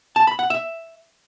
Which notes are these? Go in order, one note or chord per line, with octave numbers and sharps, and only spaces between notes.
A5
B5
F#5
E5